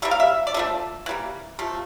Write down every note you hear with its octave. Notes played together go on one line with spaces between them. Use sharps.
E3 G3 A#3 E5
F5
E5
D5
D3 F3 A3 E5
E3 G3 A#3
C3 F3 A3